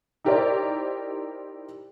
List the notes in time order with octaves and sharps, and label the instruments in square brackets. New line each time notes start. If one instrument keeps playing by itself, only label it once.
[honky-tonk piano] D#4 E4 G4 A#4 C5 D5